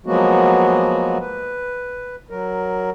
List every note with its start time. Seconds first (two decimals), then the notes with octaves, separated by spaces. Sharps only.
0.06 F3 F#3 G#3 A#3 B3 F#4
1.20 B4
2.30 F#3 A#4